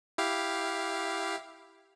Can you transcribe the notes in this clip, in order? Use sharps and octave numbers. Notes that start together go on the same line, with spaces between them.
E4 G4 F5